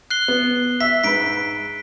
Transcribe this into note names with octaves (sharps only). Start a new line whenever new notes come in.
F#6 C7 G7
B3
E5 B6
G#2 B4 B6 D7